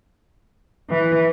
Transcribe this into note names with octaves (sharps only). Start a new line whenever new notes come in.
E3